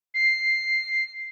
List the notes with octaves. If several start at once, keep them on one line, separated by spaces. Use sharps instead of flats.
C7